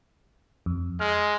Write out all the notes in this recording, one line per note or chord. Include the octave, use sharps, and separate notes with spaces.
F2
G#3 F6